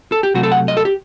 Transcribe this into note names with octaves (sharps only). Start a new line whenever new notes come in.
A4
G4
C3 F#3 A3 F#4
A4
F#5
D#5
A4
G4